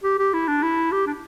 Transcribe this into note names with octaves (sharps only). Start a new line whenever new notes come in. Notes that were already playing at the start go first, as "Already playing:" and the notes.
G4
G4
E4
D4
E4
G4
D4